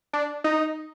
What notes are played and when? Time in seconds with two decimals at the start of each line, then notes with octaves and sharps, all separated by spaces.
0.13 D4
0.44 D#4